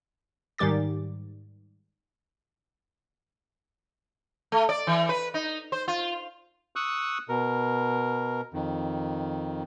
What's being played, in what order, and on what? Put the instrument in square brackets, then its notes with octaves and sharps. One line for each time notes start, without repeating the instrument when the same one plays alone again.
[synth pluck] G#2 D#3 G3 G4 D6 A6
[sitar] A3
D5
E3
B4
D#4
C5
F4
[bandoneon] C#6 D#6 E6 F#6
B2 A#4
F2 D#3